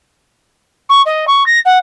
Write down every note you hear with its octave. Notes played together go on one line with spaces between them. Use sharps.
C#6
D#5
C#6
A#6
F#5